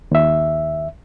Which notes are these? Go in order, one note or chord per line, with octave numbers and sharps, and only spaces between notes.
D#2 E5